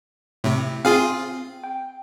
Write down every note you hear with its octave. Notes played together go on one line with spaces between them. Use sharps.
A2 C3
C4 F4 G#4 F5
G5